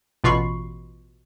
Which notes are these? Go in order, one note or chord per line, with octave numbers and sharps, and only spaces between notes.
A1 B2 F4 B5 C#6 C7